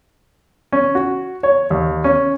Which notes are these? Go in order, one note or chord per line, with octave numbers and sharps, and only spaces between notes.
C#4
F#4
C#5
D#2
C#4